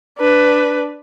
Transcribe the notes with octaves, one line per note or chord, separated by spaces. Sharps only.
D4 B4